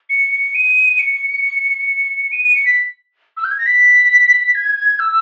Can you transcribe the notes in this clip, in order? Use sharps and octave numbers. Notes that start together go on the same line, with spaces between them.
C#7
D#7
C#7
D#7
D#7
C#7
B6
E6
G6
G#6
A#6
B6
G#6
E6